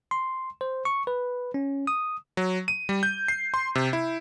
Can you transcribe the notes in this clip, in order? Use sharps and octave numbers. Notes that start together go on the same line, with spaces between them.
C6
C5
C#6
B4
C#4
D#6
F#3
D#7
G3
G6
C7
C6
C3
E4